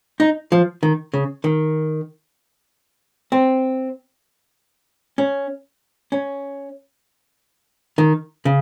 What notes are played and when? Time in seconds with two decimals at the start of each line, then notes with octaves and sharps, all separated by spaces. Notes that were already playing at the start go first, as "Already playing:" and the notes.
0.20 D#4
0.52 F3
0.83 D#3
1.14 C#3
1.44 D#3
3.32 C4
5.18 C#4
6.12 C#4
7.98 D#3
8.45 C#3